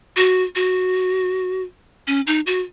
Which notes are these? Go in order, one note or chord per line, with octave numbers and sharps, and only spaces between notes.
F#4
F#4
C#4
D#4
F#4